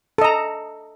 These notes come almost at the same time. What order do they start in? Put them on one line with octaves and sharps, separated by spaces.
A4 D#5 A#5